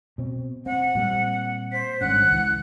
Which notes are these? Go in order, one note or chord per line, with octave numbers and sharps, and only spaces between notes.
B2 C4
C4 F#5
A#2 G3 C4
C5 B6
G#1 G2 C#4 F#5 F#6
C#2 E3